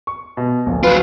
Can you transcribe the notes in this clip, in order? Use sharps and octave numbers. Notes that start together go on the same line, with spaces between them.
C#6
B2
D1 A#1
F#3 F4 B4